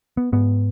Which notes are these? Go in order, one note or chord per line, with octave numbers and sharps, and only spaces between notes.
B3
G#2 B3